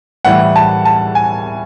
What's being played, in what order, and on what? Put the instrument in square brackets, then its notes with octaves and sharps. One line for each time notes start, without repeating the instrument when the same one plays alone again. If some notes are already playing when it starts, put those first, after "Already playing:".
[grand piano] A2 E3 G3 F#5
A5
A5
G#5